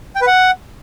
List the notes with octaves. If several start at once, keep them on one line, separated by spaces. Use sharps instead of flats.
G5
B4
F#5